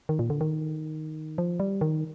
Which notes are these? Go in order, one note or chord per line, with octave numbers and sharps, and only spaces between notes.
D#3
A#2
D3
D#3
F3
G3
D#3